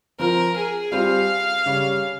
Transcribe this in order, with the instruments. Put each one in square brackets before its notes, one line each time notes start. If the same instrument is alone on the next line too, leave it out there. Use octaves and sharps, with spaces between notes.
[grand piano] F3 C4 F4 [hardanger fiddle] A#4
[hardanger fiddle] G#4
[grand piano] G3 C4 F4 [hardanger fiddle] F5
[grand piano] C#3 G3 C#4